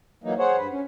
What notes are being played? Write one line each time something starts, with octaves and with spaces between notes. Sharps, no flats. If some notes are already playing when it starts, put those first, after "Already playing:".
E3 F#3 A#3 D#4
G#4 C5 C#5 F#5
G2 B4
C#4